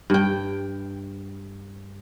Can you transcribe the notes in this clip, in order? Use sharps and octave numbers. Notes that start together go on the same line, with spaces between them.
G2 G5